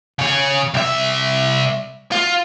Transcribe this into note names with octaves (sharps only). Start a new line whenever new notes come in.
C#3 C#5
C2 E5
F4